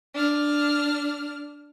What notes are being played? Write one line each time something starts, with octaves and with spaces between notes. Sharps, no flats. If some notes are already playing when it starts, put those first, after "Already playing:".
D4 F6